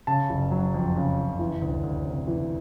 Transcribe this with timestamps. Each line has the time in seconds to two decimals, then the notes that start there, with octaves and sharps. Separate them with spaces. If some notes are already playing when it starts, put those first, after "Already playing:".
0.07 C#3 A5
0.30 F#1
0.51 F#3
0.74 F2
0.96 C#3
1.18 F#1
1.39 E3
1.62 D2
1.83 D2
2.06 C3
2.28 E3